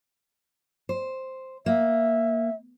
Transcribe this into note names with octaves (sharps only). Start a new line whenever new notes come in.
C5
A#3 E5